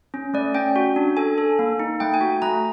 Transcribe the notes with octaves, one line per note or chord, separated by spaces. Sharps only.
C#4
A3 D5
C#4 G5
F#4
D4
A4 G#5
A4
A#3
D#4
A3 G5
G#5
F#4
A3 A#5